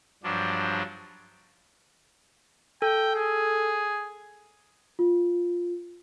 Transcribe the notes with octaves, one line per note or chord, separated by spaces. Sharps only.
G2 F3 F#3 D4
A4 G5
G#4
F4